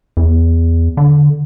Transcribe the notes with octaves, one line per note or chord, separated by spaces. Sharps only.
E2
D3